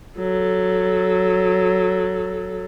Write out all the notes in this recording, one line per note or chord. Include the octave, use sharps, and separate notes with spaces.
F#3 A4